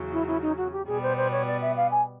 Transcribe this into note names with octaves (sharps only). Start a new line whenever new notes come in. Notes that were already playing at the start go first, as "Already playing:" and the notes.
Already playing: E2 C#3 F#3
E4
E4
D#4
F#4
G4
B2 G3 B3 G#4
C5
C5
C#5
D5
E5
F5
G#5